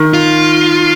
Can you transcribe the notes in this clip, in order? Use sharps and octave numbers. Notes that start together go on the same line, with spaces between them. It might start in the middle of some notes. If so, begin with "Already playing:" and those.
Already playing: D#3
F4